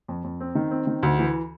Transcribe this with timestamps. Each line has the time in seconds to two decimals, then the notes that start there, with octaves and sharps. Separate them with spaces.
0.08 F2
0.24 F2
0.40 C4
0.55 D#3
0.71 C4
0.87 D#3
1.03 D2
1.19 E3